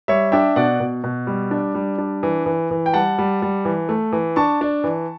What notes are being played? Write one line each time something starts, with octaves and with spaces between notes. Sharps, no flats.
G3 C#5 E5
D4 E5 G5
B2 D5 F#5
B2
B2
G3
D4
G3
D4
E3
E3
E3
G5
G3 F#5 A5
G3
G3
E3
A3
E3
D4 A5 C#6
D4
E3